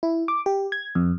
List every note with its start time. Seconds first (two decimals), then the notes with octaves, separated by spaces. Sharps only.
0.03 E4
0.28 D6
0.46 G4
0.72 G#6
0.95 F2